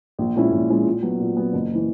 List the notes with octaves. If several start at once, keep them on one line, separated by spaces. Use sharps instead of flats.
A#1
A#2 G#3 C#4 E4
A#1
A#2 G#3 C#4 E4
A#2
F#3 B3
A#2
F#3 B3
F#1
E3